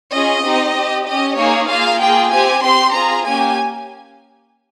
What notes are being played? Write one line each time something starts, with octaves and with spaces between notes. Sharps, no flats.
C#4 F4 G#4 D#5
C4 D#4 G4
C4 G4
C#4 G4 D#5
A#3 D#4 G#4 C#5
A#3 F4 G#4 F5
A#3 F4 G#4 G5
C4 G4 G#5
C4 G4 C6
C4 F4 G#4 A#5
A#3 C#4 G4 G#5